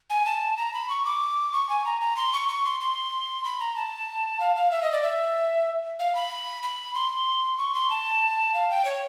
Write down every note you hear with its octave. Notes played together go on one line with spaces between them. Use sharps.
G#5
A5
A#5
B5
C#6
D6
C#6
G#5
A#5
A#5
C6
C#6
C#6
C6
C6
B5
A#5
A5
F5
F5
E5
D#5
D5
E5
F5
B5
B5
C6
C#6
C6
A5
F5
G5
C#5